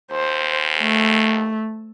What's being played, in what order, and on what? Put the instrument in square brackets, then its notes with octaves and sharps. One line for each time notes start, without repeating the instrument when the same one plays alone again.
[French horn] D#2 [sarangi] C5
[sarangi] A3